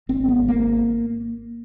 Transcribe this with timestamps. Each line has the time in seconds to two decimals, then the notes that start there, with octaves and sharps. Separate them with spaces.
0.09 G#1 C4
0.23 G#2
0.28 B3
0.38 G#1
0.48 A#3
0.54 G#1